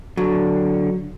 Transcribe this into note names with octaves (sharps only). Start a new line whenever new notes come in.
D3 F#3